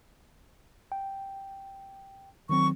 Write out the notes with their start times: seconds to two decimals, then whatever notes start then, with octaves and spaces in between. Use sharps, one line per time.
0.92 G5
2.49 D#3 F#3 C4 C#6